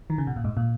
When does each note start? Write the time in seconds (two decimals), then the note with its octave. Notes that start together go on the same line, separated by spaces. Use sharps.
0.10 D#3
0.18 C#3
0.27 B2
0.36 A#2
0.44 G#2
0.57 A#2